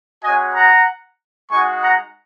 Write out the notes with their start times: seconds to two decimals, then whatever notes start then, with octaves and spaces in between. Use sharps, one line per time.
0.24 G#3 C#4 F#4 D#5 G#5
0.55 F#5 A#5
1.51 G#3 D#4 F#4 G#5 C#6
1.83 F#5 A#5